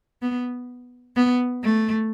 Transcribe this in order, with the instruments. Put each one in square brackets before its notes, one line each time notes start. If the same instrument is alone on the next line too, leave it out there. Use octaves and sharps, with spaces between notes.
[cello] B3
B3
A3